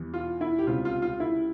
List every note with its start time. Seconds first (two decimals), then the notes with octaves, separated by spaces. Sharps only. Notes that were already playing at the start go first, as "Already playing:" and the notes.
Already playing: E2 E3 G3
0.14 F4
0.41 E4
0.59 G4
0.67 C#2 C3 G3 F4
0.85 F4
1.02 F4
1.20 E4